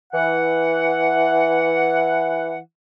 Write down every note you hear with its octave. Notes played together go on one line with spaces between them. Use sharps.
E3 F#5